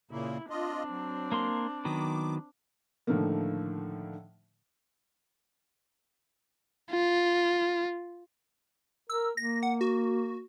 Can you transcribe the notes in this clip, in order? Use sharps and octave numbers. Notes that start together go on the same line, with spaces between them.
A#2 C#3 A#3 E4
C4 D4 F4 D#5
F#3
A#3 A#4 C6
D#3 F#3 B3 D6
A2 D3 D#3 F3 A3 A#3
F4
A#4 E6
A#3 A#6
F#5
F#4